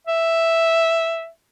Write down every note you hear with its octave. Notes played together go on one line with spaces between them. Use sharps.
E5